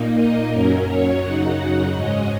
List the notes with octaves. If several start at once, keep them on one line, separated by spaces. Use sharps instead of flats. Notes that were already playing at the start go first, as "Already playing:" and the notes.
Already playing: A#2 A#3 D#4
D#5
F#2 F#3 C#4 A#4
C#5
F#2 C#3 F#3 D#4 F#5
G#2 G#3 C#4 D#5